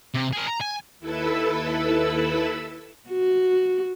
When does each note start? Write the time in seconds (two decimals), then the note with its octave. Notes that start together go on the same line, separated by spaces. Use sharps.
0.14 C3
0.33 G#4 A#4
0.47 A#5
0.61 G#5
0.99 D#2 E4 A4 B4 B5 E6
3.10 F#4